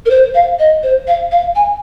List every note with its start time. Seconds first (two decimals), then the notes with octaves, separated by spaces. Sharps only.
0.06 A#4
0.10 C5
0.35 F5
0.59 D#5
0.83 C5
1.07 F5
1.32 F5
1.56 G#5